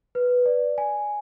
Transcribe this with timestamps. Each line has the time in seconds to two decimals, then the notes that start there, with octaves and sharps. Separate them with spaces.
0.15 B4
0.46 D5
0.78 G#5